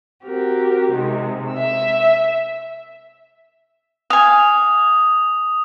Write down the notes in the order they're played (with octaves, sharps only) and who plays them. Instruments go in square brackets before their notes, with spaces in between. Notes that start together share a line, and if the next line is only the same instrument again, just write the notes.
[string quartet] C4 F#4 G4 A#4
C3 D#3 G#3 C4
E5 E6
[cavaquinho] F5 G#5 [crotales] D#6